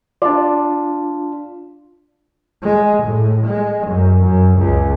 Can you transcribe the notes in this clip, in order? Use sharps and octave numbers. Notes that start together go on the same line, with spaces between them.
D4 F4 D5
G#3
A2
G#3
F#2
F#2
C#2